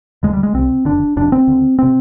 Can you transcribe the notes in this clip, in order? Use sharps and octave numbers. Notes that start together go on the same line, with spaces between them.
D2 D3 G#3
G3
G#3
C2 C3 C4
F1 D#2 D3 D4
F1 F2 C3 D4
C4
D2 D3
C3 C4